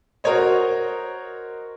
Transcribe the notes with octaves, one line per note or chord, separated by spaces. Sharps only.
F#4 A#4 C5 C#5 D#5